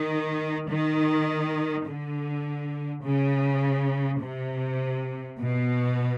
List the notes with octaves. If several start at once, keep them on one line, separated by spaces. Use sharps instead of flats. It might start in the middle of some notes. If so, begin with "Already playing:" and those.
Already playing: D#3
D#3
D3
C#3
C3
B2